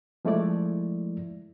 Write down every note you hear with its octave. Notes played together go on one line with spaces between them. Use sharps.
F3 G#3 A3 E4 D5